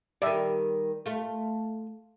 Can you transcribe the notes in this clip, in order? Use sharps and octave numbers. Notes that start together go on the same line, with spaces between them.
D#3 G3 D5 E5
A3 F4